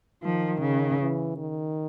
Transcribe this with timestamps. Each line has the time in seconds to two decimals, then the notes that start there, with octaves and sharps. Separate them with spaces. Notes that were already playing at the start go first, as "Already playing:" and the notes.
0.23 D#3 F3
0.62 C#3
1.00 E3
1.37 D#3